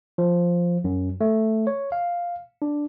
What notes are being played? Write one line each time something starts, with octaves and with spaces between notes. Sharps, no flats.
F3
F#2
A3
C#5
F5
D4